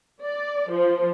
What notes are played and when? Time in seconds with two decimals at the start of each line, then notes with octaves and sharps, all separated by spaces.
0.23 D5
0.71 F3